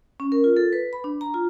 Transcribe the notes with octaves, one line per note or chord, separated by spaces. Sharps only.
C#4
A#4
F4
A4
B4
B5
D4
A#5
F4